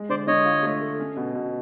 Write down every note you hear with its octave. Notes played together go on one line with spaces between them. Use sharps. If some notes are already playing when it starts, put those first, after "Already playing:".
Already playing: G#3
D3 C5 D5
D3 C#5 D#5
F4
A3
A4
C#4
B2
B2